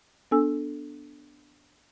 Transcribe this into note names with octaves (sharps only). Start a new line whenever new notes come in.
B3 D4 A4 G#5 E6